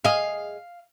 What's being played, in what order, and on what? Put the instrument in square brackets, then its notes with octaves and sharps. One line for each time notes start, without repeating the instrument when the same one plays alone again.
[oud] G#4 D#5 [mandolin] F5